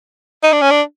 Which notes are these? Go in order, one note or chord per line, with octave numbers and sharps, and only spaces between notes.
D#4
D4
C#4
D4